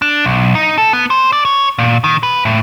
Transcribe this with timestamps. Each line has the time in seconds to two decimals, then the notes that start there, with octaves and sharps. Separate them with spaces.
0.02 D4
0.24 B1
0.55 D#4
0.78 A4
0.93 B3
1.10 C5
1.33 D5
1.45 C#5
1.79 A#2
2.04 D#3
2.23 B4
2.45 A2